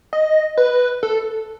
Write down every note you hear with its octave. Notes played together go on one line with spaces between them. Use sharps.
D#5
B4
A4